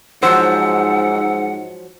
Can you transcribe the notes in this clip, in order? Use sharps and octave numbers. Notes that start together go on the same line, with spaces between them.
G#2 F3 F#3 C5 F#5 E6